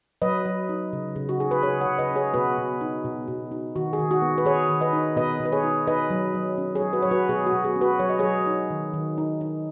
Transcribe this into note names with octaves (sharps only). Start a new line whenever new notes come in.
F#3 B4 D#5
F#3
D#4
C#3
C#3
F#4
D#4 G#4
B4
C#3 G#4 C#5
C#5 F#5
C#3
B4 D#5
C#4
G#4 C#5
B2 F#4 B4
B2
D#4
B2
B2
D#4
D#3 F#4
G#4
D#3
F#4
B3
B4
D#3 G#4 C#5
D#3
B4 D#5
D#4
B2 B4 D#5
B2
B4
G#4 C#5
D#4
D#4 B4 D#5
F#3
F#3
C#4
G#4 C#5
F#3
F#4 B4
F#3 C#5
F#4 B4
B2 G#4
F#4
B2
G#4
C#4
F#4 B4
F#3 C#5
D#5
F#3 G#4 C#5
D#4
D#3
D#3
D#4
D#4